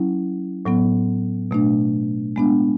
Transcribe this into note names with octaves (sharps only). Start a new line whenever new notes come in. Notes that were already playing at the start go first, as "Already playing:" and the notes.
Already playing: F#3 C#4 E4
A2 F#3 B3
B2 A3 D4
G#3 B3 D4